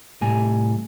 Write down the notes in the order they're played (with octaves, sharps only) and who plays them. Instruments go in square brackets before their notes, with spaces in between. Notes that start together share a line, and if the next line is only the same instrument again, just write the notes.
[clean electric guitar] C2 A2 G3 G#5